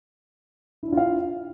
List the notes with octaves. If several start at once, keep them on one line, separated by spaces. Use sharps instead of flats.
D4 E4 F4 F5